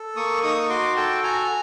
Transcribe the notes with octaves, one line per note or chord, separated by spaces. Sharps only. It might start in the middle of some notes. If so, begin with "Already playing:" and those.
Already playing: A4
A#3 C#6 D#6
D#4 C#6 D#6
C#6
F#4 C6 D6
A4 G5 A5
F#4 G#5 A#5